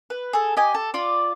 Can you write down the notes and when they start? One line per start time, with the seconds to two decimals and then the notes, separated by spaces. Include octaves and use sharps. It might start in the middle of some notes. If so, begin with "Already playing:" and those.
0.10 B4
0.33 G#4 A4
0.57 G4 D#5 G#5
0.74 A4
0.94 F4 D5